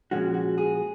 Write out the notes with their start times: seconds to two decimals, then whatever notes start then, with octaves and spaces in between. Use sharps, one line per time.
0.11 A#2 F3 G#3 C#4 F#4
0.34 F#4
0.58 G#4